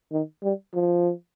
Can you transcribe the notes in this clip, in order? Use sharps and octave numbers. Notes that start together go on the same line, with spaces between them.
D#3
G3
F3